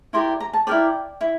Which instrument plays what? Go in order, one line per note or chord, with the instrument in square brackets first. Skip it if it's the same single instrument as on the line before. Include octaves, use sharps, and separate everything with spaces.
[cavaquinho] E4 G4 A#4 D5 C6
A#5
A5
E4 A#4 D5 G5
E4